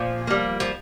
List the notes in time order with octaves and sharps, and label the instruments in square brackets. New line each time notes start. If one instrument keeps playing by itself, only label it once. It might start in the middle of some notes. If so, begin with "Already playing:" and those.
Already playing: [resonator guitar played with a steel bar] A#2 [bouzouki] F3
[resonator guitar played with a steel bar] G3 A#3
[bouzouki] F3